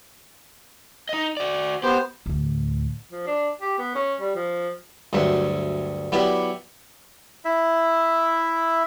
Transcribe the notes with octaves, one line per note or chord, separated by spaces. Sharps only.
D#4 D#5
F#4 D5
B3 G4 C5
D2 A2
F3
D4
G4
B3
C#4
G3
F3
D2 G2 F#3 E5 C6
F#3 B3 E4 G4 D5 E5
E4 E5